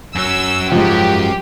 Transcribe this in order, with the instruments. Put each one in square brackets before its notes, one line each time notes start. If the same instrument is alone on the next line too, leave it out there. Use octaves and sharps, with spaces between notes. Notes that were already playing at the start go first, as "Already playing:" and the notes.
[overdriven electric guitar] F#2 F#3 [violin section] E6
[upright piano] G#2 F3 [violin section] G4